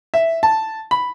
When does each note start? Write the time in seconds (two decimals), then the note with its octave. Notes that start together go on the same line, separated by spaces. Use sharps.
0.14 E5
0.43 A5
0.91 B5